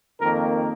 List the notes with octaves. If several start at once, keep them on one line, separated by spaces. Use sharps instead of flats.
F2 D#3 A#3 A#4